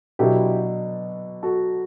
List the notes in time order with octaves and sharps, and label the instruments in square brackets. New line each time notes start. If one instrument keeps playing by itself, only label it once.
[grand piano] B2 F#3 B3 D4 A4 [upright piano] E4 G4
[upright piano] F#4 A4